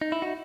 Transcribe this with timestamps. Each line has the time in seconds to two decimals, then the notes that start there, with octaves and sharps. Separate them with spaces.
0.01 D#4
0.12 E4
0.22 D#4 F#4